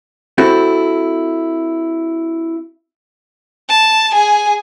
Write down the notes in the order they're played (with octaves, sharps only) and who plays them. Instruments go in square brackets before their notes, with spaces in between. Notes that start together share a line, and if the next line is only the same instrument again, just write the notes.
[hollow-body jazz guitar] C4 E4 F#4 A4
[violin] A5
G#4 G#5